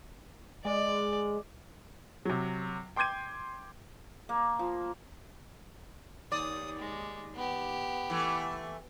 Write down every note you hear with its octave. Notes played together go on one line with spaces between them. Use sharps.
G#3 D5
C3 F#3
G5 C6 D6 G6 G#6 D#7
A#3
F3
D#2 D5 D#6
G#3
B3 G4
E3 A3